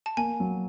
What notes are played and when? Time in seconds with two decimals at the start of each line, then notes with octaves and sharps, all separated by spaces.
0.06 A5
0.17 A#3 G#5
0.40 F#3